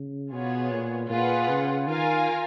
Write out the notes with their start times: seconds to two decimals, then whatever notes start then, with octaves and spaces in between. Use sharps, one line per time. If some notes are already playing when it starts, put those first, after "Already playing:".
Already playing: C#3
0.32 B2 B3 F4 G#4 C#5
0.71 A#2
1.10 A#2 F4 G#4 B4 F#5
1.49 C#3
1.87 D#3 F4 A#4 F5 G#5